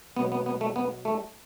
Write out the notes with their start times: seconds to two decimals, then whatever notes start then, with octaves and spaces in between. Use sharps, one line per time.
0.17 B2 F#3 B3
0.32 B3
0.46 B3
0.61 A3
0.76 B3
1.05 A3